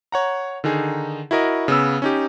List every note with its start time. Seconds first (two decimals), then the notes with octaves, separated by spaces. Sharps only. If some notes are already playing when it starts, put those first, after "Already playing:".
0.12 C#5 F#5 A#5
0.64 D3 D#3 D#4 G#4
1.31 E4 F#4 A#4 D#5
1.68 C#3 B3 E6
2.02 C#4 D#4 G4